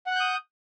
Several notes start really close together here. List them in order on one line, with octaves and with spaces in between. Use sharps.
F#5 F#6 G6 D#6